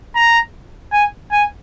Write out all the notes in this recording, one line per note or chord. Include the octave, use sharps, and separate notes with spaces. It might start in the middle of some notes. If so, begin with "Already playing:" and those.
A#5
G#5
G#5